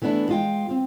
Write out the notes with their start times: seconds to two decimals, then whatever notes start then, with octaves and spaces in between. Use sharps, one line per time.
0.02 E3 A3 B3 D4 E4
0.29 G#3 F4 G5
0.69 C4 F4